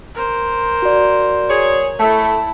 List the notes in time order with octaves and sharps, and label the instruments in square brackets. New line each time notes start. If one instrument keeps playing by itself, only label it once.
[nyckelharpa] A#4 C5
[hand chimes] F#4 D5
[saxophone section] G#4 C#5
[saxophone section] A3 [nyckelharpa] E4 [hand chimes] A5